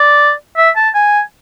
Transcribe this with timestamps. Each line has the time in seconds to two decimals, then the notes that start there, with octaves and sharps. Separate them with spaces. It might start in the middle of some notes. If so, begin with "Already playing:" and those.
Already playing: D5
0.57 E5
0.76 A5
0.94 G#5